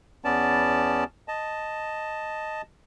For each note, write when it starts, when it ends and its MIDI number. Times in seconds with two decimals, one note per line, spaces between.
0.25 1.04 40
0.25 1.04 59
0.25 1.04 61
0.25 1.04 74
0.25 1.04 81
1.28 2.62 75
1.28 2.62 81